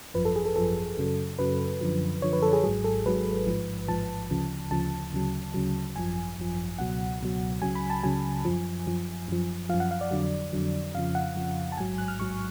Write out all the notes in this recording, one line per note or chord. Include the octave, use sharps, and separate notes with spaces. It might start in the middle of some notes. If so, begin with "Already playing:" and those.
G#1 F#2 F3 B4
A4
G#4
A4
G#1 F#2 F3 A4
F#2 C#3 F#3
F#2 C#3 F#3 B4
F#2 D3 F3
F#2 D3 F3 C#5
B4
A4
G#4
G#1 G#2 F#3 G#4
A4
G#1 G#2 F#3 B4
A1 G#2 F3
A1 G#2 F3 A5
D2 C#3 F3
D2 C#3 F3 A5
D2 C#3 F#3
D2 C#3 F#3
G#1 F#2 F3 G#5
G#1 F#2 F3
C#2 B2 F#3 F#5
C#2 B2 F#3
C#2 C#3 F#3 G#5
B5
A5
C#2 C#3 F#3 G#5
F#2 F3
F#2 F3
F#2 F3
F#2 F3 F5
F#5
F5
D5
F2 D3 F#3
F2 D3 F#3
F2 C#3 F3 F5
F#5
F2 C#3 F3
A5
A1 G#2 F#3 G#5
F#6
F6
A1 G#2 F#3 C#6